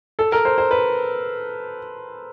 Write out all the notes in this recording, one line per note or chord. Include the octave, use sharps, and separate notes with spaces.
A4
A#4
C5
C5
B4